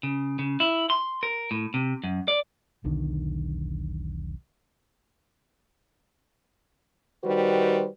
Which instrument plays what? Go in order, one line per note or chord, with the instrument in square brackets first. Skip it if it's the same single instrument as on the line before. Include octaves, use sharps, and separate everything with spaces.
[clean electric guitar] C#3
C#3
E4
C6
A#4
A2
C3
F#2
D5
[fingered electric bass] E1 B1 D3 D#3
[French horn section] D#3 G3 F#4 B4 C5